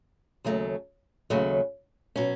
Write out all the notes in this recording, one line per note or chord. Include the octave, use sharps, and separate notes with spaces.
D#2 C#3 F#3 A3
D#2 C#3 F#3 A3
B2 F#3 C#4